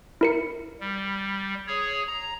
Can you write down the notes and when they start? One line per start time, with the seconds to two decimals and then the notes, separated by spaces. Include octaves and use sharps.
0.21 E4 A#4 C#7
0.80 G3
1.67 G#4 C#5
2.07 A#5